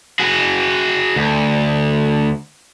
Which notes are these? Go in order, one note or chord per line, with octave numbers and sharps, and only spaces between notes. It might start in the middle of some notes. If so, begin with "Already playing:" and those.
F#4 G#4
D2